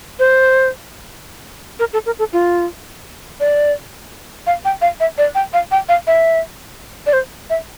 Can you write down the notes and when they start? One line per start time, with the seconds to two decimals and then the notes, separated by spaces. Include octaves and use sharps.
0.19 C5
1.79 A#4
1.93 A4
2.06 A#4
2.19 A4
2.33 F4
3.40 D5
4.47 F5
4.65 G5
4.82 F5
5.00 E5
5.18 D5
5.35 G5
5.53 F5
5.72 G5
5.89 F5
6.07 E5
7.06 D5
7.13 C5
7.50 E5